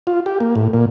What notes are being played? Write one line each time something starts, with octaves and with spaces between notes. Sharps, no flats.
F4
G4
A#3
A2
A#2